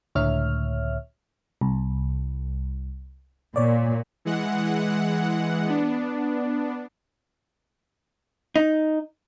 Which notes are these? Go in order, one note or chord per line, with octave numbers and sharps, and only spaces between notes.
C#2 A2 D3 C#5 E5 F6
C2
A#2 C#5 D5
E3 G#3 F#5
B3 D4
D#4